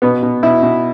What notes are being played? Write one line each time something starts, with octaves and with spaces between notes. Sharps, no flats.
B2 B3
B2
B2 E4
B2